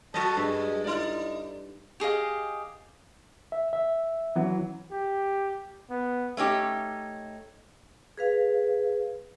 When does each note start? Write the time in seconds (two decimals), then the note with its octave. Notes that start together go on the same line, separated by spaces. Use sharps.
0.14 F#3 F#4 A4 D#5 A5
0.37 G2 G#3
0.84 D#4 E4 D5
2.00 G4 G#4 D#5 F5
3.52 E5
3.73 E5
4.35 E3 F#3 C#4
4.91 G4
5.90 B3
6.37 A3 C#4 D#4 G4
8.17 G#4 B4 F5